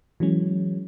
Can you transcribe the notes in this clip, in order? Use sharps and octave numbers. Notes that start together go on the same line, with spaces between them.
E3 F#3 G#3 C#4